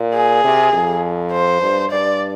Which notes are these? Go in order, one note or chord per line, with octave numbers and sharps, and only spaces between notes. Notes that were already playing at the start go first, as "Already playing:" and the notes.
Already playing: A#2
G#4
C3
F2
C5
G2
G2 D5